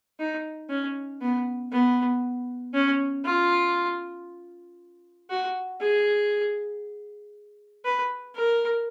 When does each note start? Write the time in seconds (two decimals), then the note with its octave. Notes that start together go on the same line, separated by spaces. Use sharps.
0.19 D#4
0.70 C#4
1.21 B3
1.72 B3
2.74 C#4
3.25 F4
5.30 F#4
5.81 G#4
7.85 B4
8.36 A#4